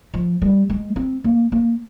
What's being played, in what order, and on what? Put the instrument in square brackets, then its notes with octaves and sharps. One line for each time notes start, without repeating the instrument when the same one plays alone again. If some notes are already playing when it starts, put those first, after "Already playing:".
[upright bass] F3
G3
G#3
C4
A#3
A#3